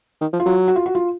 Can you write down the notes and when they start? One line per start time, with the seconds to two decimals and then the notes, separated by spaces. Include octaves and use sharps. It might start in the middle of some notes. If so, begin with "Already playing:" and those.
0.21 D#3
0.33 F3
0.40 F4
0.46 F#3
0.68 F#4
0.76 F4
0.86 F#4
0.95 F4